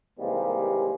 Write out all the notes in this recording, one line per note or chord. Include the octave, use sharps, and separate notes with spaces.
D#2 C3 E3 G3 G#3 A#3